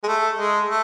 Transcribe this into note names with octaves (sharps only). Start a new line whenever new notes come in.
G#3
A3
G#3
A3